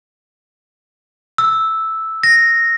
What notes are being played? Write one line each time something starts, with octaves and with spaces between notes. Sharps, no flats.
E6
A#6